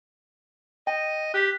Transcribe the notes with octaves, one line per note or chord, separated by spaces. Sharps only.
D#5 G5
G4 F#6 B6